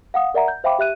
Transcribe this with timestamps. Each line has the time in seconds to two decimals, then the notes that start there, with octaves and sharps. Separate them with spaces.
0.14 F5 F#5 D#6
0.34 A#4 D5 E5 F#5 A#5
0.48 G6
0.64 C5 E5 F5 G5 B5 D6
0.78 G4 E5 F#6 D#7